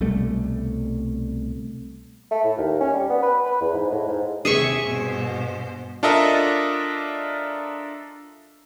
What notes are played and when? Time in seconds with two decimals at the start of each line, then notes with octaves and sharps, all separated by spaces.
0.01 C2 B2 G3 A3
2.31 A3
2.44 A2
2.58 D#2
2.81 C#4
2.94 G3
3.10 B3
3.23 B4
3.46 B4
3.61 E2
3.74 G#2
3.92 A2
4.08 G#2
4.45 D#2 C3 G#4 E5 C#6
4.86 G2 B2 C5
6.03 D4 F4 A4 A#4 D#5 E5